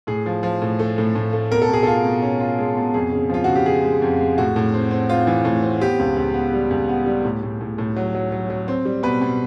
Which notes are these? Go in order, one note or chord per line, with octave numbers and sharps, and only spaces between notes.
A2 G#4
F3
F3
A2
A3
A2
A2
A3
B2 A#4
A4
B2 G#4
F4 A4
B2
C#4
F4
G#3
B2
F2 G#4
C#3
F3 F4
C#3 F#4
G4
C#3 G#4
G#3
F2
G#3
A2 F#4
A2
C4
C4
C4 F4
E3
A2
C4
B3 G4
C#2
C#2
B3
G3
C#2
B3
G3
A2
A2
A2
A2
F#3
F#3
F#3
F#3
C4
G3
B2 B4
B2